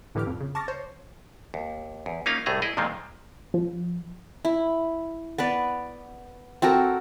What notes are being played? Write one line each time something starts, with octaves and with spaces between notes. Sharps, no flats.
A2 D3 E3 G4 D6 F6
F2
C#3
A5 C#6 D6 F6 A6 A#6
C5 C#5
D#2
E2
A#3 C#4 D#4 F4 F5
C2 A2 A3 G#4 A#5
E4 G#4 D#5
F2 A#2 D#3 F3 G#3 C4
F3
E4
B3 B4 D5
C4 F#4 A4 A#4